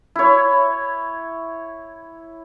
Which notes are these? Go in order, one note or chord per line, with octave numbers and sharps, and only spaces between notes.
E4 C#5